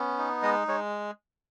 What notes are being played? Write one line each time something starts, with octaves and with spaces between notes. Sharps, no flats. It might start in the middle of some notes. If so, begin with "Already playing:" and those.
Already playing: B3 C#4
D#4
G#3 D#5
G#3 C#5